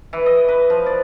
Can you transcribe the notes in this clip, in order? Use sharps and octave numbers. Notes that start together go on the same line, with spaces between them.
E3
D#5
B4
F3
D5